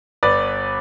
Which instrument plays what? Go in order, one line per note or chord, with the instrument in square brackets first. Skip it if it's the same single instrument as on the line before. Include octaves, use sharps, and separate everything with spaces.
[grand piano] G1 B4 D5